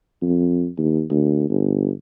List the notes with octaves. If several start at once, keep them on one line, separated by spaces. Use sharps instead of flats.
F2
D#2
D2
G1